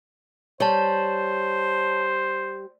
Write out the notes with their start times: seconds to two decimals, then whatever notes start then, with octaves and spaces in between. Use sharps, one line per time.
0.60 G3 C5 C#5 A5